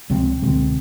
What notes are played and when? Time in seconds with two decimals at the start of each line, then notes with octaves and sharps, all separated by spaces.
0.10 C#2 C3 F3 C4
0.42 C#2 B2 D3 C4